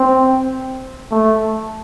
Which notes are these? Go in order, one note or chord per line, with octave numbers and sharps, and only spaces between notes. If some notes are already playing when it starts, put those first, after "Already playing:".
Already playing: C4
A3